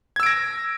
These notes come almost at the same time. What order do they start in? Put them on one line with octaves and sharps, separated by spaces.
G#6 E6 D7 A#6